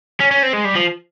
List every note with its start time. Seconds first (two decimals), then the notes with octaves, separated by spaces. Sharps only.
0.20 C#4
0.31 C#4
0.43 C4
0.53 G#3
0.65 G3
0.75 F3